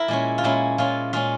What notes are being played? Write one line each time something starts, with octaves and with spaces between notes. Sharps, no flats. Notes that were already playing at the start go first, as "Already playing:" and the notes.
Already playing: E4 A#4
A#2 G#3 C#4
F4
A#2 G#3 C#4 E4
A#2 G#3 C#4 F4
A#2 G#3 C#4 F4